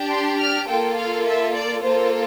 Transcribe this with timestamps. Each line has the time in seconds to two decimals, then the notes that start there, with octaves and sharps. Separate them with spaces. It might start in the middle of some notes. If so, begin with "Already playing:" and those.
Already playing: D4 G4
0.11 C6
0.39 F6
0.68 A#3 F4 A4 G5
0.97 F5
1.26 E5
1.54 D5
1.84 A#3 F4 A4 C5